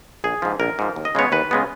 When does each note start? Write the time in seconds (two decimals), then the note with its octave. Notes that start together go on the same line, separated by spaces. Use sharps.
0.24 A#1 G#4
0.42 G#2 F3
0.60 A#1 A#4
0.79 G#2 F3
0.96 D#2
1.05 D#5
1.15 C#3 G#3 B3 C#5
1.32 D#2 B4
1.51 C#3 G#3 B3